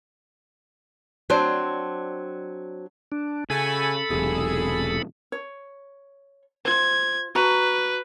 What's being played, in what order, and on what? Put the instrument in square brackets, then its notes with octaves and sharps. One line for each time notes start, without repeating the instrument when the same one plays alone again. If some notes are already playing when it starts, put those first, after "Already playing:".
[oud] F#3 C4 D4
[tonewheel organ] D4
[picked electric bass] C#3 [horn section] A3 F#4 G#5 [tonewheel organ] A4 B5
[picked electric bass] E1 B1 C3 [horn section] G#4
[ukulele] C#5
[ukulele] F4 C5 [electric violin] G#6
[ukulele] F#4 A#5 [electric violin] B4